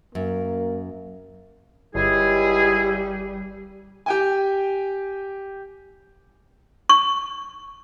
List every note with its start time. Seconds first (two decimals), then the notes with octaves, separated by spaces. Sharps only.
0.15 F#2 A#3
1.95 G1 C#2 G3 E4 G#4
4.06 G4 G5 G#5
6.89 C#6